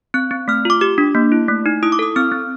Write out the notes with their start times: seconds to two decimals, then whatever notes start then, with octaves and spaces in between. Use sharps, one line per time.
0.14 C4 F#6
0.31 C4
0.48 A3 F6
0.65 F4 D6
0.81 G4 D6
0.98 D4
1.15 A#3
1.32 E4
1.48 A3
1.66 D#4
1.83 E4 D#6
1.92 D6
1.99 A4 D#6
2.16 C4 F6
2.32 C4